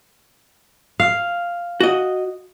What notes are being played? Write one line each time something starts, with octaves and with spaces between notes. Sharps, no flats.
F5
F#4 D#5